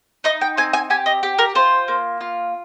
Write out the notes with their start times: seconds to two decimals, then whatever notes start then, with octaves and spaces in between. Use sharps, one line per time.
0.24 D#4 D#5
0.41 G5
0.57 C4 G#5
0.73 G#5
0.90 G4 G#5
1.06 D#5
1.23 G4
1.38 A#4
1.55 F4 C5
1.88 A#3
2.21 F4